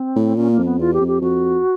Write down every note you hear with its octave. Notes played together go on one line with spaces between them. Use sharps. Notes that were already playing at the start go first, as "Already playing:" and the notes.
Already playing: C4
A2
A#2 C#4
A#3
F2
B3
E2 F4
G4
F2
G4
F2 F#4